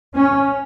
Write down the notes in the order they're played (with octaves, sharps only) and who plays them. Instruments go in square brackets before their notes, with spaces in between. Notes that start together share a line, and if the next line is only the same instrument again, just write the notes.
[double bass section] C#4